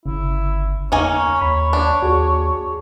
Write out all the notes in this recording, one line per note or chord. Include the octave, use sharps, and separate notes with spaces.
G1 C#3 E4
E2 A#3 C#4 D#4 G#5
D#2 C#5 B5
D4
D#2 F#4 G#4